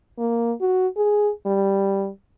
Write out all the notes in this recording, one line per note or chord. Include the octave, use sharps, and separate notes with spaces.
A#3
F#4
G#4
G3